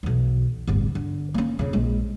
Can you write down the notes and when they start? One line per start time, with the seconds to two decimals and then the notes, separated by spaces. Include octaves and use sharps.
0.03 B1 E2
0.67 D1 G1
0.95 D3
1.34 A#3 C#4
1.59 F2 C#3
1.73 A#1 G#3